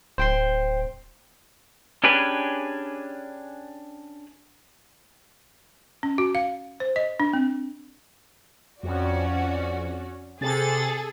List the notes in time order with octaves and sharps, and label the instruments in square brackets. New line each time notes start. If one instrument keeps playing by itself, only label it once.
[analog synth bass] D1 [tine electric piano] C5 G5 C6
[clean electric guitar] C#4 D4 G4 G#4 B4
[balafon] C#4
F#4
F5
C5
D#5
D4
C4
[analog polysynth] F2 [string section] C#4 F#4 D5
[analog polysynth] C3 A6 [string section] G#4 A4